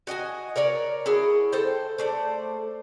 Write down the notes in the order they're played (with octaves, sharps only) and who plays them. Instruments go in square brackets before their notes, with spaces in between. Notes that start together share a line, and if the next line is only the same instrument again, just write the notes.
[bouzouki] F#4 D#5 G5 G#5
A#4 C#5 D5 A#5
E4 F#4 G#4
A4 C5 G5
A3 C5 D5